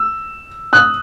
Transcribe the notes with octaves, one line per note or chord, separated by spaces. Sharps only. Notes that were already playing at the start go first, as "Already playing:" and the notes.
Already playing: E6
D#6 F#6